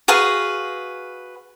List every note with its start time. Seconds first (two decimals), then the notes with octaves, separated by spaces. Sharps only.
0.08 F#4 G#4 B4 F5